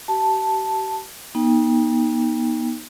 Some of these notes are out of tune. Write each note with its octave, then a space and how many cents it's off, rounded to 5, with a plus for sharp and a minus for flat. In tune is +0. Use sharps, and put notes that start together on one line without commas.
G4 -40 A5 +0
B3 -45 D#4 +0 G5 +30